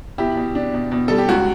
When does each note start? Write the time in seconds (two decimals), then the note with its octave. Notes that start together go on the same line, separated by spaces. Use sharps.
0.18 B2 E4 G4
0.37 B2
0.55 D4
0.74 B2
0.92 B2
1.08 G3 A4
1.18 G4
1.29 C#2 F#4